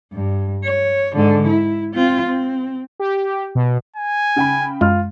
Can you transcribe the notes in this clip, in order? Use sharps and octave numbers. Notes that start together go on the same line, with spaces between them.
G2
C#5
G#2 D3
E4
C4 F4
C4
G4
B2
G#5
C#3 G5 B5
F#2 G#3 F4 F6